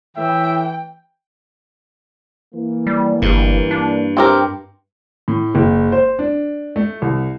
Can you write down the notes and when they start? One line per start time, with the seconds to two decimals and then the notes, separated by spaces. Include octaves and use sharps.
0.17 A2 E3 E5 G5
2.55 E3 A#3
2.87 G3
3.22 G1 G2
3.71 D4
4.17 C4 G4 A#4
5.28 A2
5.55 F#1
5.92 C5
6.19 D4
6.76 A3
7.02 C2